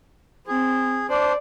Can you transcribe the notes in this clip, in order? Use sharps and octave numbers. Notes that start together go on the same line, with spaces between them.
C4 G#4
D4 C5 D5